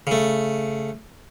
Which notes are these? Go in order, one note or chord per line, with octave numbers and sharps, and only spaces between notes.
C#3 A3